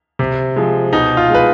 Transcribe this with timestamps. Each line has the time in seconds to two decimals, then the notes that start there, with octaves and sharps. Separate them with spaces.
0.19 C3
0.56 F3 G#3
0.93 B2 D#4
1.17 F4
1.30 G#3 B4